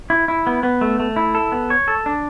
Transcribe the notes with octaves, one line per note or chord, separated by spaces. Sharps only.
E4
E4
B3
B3
A3
A3
E4
A4
B3
C#5
A4
D4